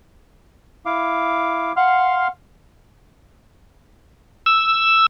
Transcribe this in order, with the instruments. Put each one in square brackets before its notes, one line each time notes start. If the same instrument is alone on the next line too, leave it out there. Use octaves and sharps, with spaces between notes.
[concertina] E4 F5 D6
[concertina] F5 C6 F6 [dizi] F#5
[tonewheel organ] E6